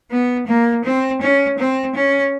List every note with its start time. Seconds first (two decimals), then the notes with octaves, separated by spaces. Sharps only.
0.11 B3
0.47 A#3
0.85 C4
1.21 C#4
1.59 C4
1.96 C#4